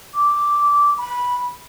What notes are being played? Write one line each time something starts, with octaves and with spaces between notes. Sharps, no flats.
D6
B5